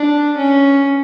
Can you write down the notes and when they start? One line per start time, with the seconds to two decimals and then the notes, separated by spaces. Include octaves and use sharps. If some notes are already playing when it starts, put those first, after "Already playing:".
Already playing: D4
0.37 C#4